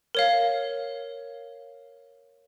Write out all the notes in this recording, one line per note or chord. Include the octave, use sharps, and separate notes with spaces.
A#4 C#5 F5